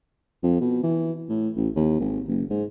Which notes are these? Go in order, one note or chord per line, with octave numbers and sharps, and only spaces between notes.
F2
B2
E3
A2
A1
D#2
G#1
F#1
G#2